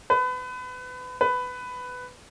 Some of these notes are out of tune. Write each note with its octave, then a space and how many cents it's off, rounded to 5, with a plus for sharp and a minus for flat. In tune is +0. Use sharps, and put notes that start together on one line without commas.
B4 +30
B4 +15